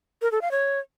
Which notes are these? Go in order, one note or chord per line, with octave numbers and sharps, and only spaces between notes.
A#4
A4
F5
C#5